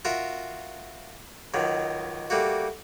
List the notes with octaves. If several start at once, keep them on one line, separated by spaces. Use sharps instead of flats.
F4 F#4 A#4 E5
C#2 D#3 F#3
G3 A3 A#3 F#4